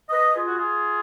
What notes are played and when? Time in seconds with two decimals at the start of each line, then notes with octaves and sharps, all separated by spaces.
0.10 B4 D#5
0.33 F4 G#4
0.48 F#4
0.58 F4 G#4